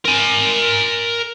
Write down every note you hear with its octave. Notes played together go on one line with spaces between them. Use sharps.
A#4 G#5